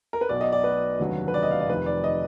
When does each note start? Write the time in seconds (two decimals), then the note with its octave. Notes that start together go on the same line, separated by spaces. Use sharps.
0.13 A#4
0.21 B4
0.29 B1 B2 F#3 D5
0.41 D#5
0.52 D5
0.64 B4
0.99 F1 D#2 D3 F#3
1.28 B4
1.34 D5
1.43 D#5
1.51 F5
1.60 D5
1.69 F1 F2 D#3 B4
1.86 D5
2.04 D#5